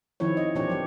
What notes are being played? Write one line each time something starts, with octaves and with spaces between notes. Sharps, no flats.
D#3 F3 C4 E4 C#5
D#5
A#2 E3 C4 D4 G4 C#5
F#3 G4